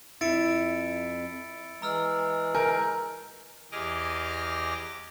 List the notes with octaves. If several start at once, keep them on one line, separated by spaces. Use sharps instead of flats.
F2 E4 A6 C#7 D7
E3 G#3 A#5 E6 F6
A#4 G#5 G6
E2 G4 G#4 D#5 D6 F6